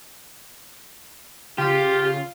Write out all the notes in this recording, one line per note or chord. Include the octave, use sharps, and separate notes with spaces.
C#3 F4 G4